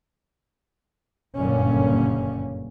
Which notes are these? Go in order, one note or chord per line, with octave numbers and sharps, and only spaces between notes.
F#1 G2 A#2 D3 A#3 C#4